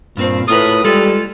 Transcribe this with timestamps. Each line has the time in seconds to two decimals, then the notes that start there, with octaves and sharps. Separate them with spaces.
0.17 G2 A#2 C4 C5
0.48 A2 F4 A#4 B4 D#6
0.84 G3 G#3 F4 A4